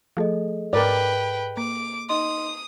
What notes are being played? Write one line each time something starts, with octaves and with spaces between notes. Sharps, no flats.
F3 A3 G#4 A4 D#5
G#2 A#4 B4 D5 G5
A#3 D6
D#4 D#5 C6 D#6